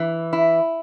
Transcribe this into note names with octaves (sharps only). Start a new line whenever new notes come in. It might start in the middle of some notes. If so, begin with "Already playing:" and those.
Already playing: E3
E4